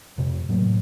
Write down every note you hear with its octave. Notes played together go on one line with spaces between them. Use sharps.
F2 C3
A2 F#3 A#3